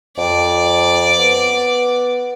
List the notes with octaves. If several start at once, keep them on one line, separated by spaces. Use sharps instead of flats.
F2 D5
B3